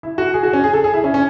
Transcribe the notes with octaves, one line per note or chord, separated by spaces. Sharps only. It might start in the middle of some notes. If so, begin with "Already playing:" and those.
E4
F#4
G#4
F#4
C#4
G#4
A4
G#4
E4
C#4
C#4